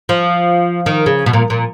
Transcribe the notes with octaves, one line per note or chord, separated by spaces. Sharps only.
F3
D#3
C#3
B2
A#2
A#2